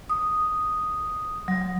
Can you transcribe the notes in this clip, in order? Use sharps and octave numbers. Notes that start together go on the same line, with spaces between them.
D#6
F#3